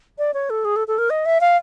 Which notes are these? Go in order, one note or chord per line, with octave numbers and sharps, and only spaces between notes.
D5
C#5
A4
G#4
A4
A4
A#4
D#5
E5
F5